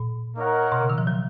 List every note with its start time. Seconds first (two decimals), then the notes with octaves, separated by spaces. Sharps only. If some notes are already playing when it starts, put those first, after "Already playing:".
Already playing: A#2
0.36 A#3 D#4 A#4 C#5 F#5
0.72 B2
0.81 C#3
0.90 D#3
0.98 F3
1.07 F#3